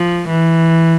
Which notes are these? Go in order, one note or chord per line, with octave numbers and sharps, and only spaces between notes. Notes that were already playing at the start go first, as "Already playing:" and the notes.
Already playing: F3
E3